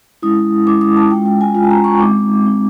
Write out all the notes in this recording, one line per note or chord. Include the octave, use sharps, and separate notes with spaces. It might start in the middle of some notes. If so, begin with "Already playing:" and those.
G#3 C#4 E4 D#6
G#3 C#4 E4 D6
D#6
A5
G#3 C#4 F4 G5
G5
G#5
G#3 C#4 F4
A5
A#5
C#6
G#3 C4 D#4 D6
G#3 C4 D#4